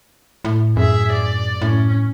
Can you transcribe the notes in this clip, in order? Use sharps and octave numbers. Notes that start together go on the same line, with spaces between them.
A2
F#2 G#4 E5
D5
A2 C#4